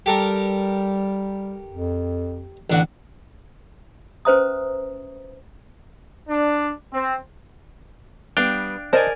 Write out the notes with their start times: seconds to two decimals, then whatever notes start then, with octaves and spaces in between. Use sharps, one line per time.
0.06 G3 G4 A4 A#4
1.73 F2
2.70 A1 D3 D4 F#4
4.25 C#4 B4 C5 E5 A#5 D#6
6.29 D4
6.93 C4
8.37 G3 B3 D4 F5 G5
8.93 A#4 C5 D5 D#5 G#5 A5